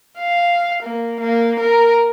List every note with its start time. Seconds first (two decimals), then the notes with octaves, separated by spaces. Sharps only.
0.19 F5
0.82 A#3
1.20 A#3
1.59 A#4